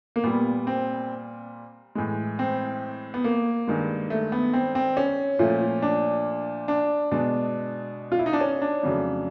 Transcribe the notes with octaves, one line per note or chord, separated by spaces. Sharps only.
A#3
A#2 G3 B3
C4
A2 E3 G#3
C4
B3
A#3
G2 D#3 G#3
A3
B3
C4
C4
C#4
A#2 F3 A3
D4
D4
B2 G#3 D4
F4
E4
D#4
D4
C#4
D4
F2 C#3 F#3 A3